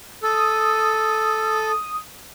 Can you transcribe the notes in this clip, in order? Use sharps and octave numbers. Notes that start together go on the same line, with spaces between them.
A4 D#6 E6